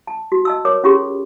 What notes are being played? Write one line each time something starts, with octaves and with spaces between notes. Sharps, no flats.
A5
F#4
D#5 A5 E6
A#4 C#5 D6
C#4 F4 G4 G#4 C6